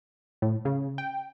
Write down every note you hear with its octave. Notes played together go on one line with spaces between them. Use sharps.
A2
C#3
G5